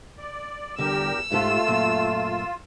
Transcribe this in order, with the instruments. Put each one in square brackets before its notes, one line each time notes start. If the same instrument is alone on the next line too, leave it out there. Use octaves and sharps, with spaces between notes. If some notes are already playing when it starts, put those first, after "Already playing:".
[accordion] D5
[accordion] E2 G4 A#4 [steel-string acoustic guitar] D3 G3 [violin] E6
[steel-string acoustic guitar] G#2 G4 A4 [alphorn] A3 [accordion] F4
[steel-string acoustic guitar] F#2 A#2